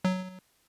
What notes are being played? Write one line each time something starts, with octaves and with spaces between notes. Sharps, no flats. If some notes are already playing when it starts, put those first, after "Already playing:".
F#3